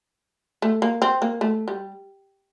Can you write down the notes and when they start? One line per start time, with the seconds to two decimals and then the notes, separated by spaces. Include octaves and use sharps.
0.62 A3
0.82 A#3
1.02 C4
1.22 A#3
1.41 A3
1.68 G3